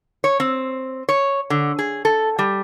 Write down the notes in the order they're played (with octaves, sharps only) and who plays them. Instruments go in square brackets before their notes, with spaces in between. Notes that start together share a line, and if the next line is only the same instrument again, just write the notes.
[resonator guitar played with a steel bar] C#5
C4
C#5
D3
G#4
A4
G3